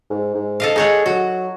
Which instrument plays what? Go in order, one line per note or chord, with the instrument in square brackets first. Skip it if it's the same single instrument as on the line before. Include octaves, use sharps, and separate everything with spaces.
[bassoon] G#2
G#2
[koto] A4 D#5 F5
[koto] D#4 C#5 F#5 [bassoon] G#4
[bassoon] F#3 [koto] F#4